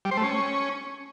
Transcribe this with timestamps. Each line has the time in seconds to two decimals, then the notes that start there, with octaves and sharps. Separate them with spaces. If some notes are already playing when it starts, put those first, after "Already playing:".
0.05 G3
0.11 C5
0.17 A3
0.23 C#4